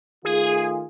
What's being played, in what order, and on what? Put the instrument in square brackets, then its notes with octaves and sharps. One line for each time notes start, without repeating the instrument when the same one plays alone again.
[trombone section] D#3 A3 F4 [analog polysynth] G#4